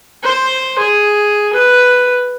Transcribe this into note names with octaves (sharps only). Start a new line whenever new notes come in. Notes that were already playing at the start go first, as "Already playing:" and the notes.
C5
G#4
B4